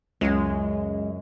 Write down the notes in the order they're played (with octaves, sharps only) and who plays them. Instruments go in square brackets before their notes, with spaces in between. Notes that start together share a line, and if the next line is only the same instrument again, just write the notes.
[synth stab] C#2 [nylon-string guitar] F#2 C#4 [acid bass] G#3